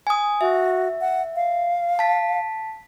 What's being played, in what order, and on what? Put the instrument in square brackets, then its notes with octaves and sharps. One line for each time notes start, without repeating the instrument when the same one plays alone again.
[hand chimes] G#5 D#6
[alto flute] F#4 [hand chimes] E5
[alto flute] F#5
F5
[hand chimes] A5 B6